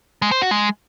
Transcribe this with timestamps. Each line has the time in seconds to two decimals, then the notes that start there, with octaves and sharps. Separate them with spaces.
0.22 G#3
0.32 C5
0.41 F#4
0.51 G#3